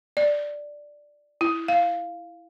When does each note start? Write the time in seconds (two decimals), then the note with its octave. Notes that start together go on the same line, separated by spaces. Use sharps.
0.17 D5
1.41 E4
1.68 F5